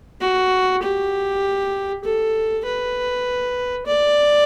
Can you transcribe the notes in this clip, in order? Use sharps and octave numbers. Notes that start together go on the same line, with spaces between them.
F#4
G4
A4
B4
D5